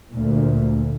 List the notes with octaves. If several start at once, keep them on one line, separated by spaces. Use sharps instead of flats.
D2 A#2